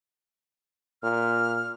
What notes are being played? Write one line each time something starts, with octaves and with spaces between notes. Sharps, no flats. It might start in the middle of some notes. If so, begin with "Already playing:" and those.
A#2 F6